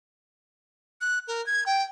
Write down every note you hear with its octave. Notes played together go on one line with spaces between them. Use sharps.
F#6
A#4
G#6
G5